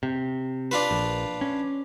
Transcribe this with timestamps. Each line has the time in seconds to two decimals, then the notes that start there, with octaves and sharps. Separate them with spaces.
0.03 C3
0.71 D4 F4 B4
0.91 A#1
1.41 C#4